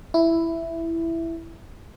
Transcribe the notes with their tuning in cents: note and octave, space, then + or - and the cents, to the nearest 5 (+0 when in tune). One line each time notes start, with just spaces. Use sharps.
E4 +5